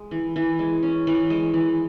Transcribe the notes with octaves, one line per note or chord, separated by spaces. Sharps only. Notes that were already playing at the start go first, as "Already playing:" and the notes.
Already playing: G#3
E3
E3
G#3
C#4
E3
G#3
E3